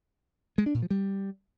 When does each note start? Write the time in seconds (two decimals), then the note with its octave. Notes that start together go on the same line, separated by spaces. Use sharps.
0.58 G#3
0.66 D4
0.74 A#2
0.82 F3
0.91 G3